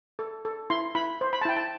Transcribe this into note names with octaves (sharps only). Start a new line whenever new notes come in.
A4
A4
E4 C6
E4 B5
C5
B5
A5
E4 G5
A5